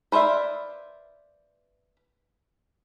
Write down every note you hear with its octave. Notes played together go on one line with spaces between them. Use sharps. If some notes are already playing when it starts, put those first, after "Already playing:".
B4 C5 D5 E5 F5